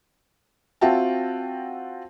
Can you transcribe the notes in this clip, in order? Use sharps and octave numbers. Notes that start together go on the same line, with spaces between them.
C4 F4 F#4 E5 G5 A5